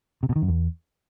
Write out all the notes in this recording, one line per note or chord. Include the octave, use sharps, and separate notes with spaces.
C3
B2
D#3
F#2
E2